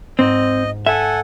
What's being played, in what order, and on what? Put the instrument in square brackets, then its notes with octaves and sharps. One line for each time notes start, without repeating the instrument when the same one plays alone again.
[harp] G#2 [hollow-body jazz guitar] C4 [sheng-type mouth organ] D#5
[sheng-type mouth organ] A4 F#5 G#5 [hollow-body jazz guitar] E5 [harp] D#7